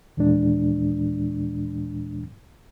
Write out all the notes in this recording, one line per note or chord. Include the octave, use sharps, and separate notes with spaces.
D#2 A#2 E3 G#3 D4